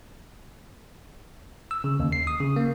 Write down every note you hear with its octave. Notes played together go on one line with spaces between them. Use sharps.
E6
C#3
D#2
C7
D#6
C#3
A#3